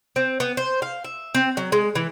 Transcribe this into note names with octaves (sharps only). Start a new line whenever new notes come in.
C4
B3
C5
F5
E5
C4
F#3
G#3
E3